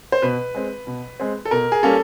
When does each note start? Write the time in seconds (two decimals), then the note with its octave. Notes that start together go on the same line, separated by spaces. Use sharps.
0.12 C5
0.22 B2 B4
0.55 G#3 C4
0.87 B2
1.20 G#3 C4
1.45 A4
1.51 B2 A#4
1.72 G#4
1.83 G3 A#3 C#4 A4